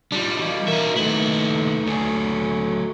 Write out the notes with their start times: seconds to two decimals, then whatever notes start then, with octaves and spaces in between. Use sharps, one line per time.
0.12 G3 D4 D#4 F4
0.40 E3 F#4 D#5 F5
0.68 D#4 A#4 E5
0.96 D#2 A3 D#4 E4 B4
1.87 D2 F#3 A4 G#5